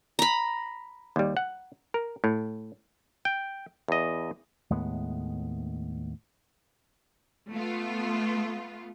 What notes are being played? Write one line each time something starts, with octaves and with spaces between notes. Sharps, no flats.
A#5 B5
D#2 G3
F#5
A#4
A2
G5
E2 D#5
D#2 A2 G#3 B3
A3 B3 F4